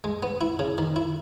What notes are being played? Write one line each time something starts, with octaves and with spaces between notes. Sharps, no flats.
G#3
B3
E4
C#3
D#3
E4